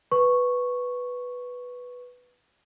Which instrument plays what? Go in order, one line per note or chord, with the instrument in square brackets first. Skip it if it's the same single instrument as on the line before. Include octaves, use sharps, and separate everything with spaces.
[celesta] B4 C#6